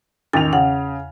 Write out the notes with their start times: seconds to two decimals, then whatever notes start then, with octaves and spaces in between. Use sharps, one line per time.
0.33 A1 E2 D#3 A6 F7
0.53 C#3 F#5